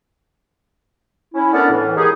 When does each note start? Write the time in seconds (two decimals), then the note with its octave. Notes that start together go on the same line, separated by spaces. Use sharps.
1.35 C#4 E4
1.52 A3 B3 D4 E4 A#4 D5
1.70 A2 E3
1.96 G#3 A#3 D#4 E4 G4 G#4